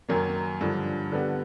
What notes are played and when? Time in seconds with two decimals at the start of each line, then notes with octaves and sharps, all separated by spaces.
0.09 F#2 D#3 F#3 A#3
0.61 G2 D3 F3
1.12 D3 G3 B3